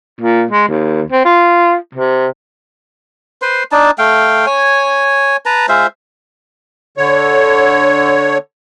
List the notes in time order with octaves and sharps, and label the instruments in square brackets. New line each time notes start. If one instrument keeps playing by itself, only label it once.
[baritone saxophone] A#2
G#3
D#2
C4
F4
C3
[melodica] B4 C5 C6
D4 D#4 A5
A3 F5 G5
C#5 G#5
B4 A5 A#5
G#3 F4 C5 E5
[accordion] D3 C#5